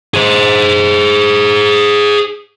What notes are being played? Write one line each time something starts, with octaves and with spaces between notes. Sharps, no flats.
G#4 C5